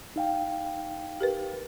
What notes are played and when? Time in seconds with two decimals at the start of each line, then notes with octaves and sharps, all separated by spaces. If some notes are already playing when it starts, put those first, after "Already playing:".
0.16 D#4 F5 G5
1.21 G4 A#4 B4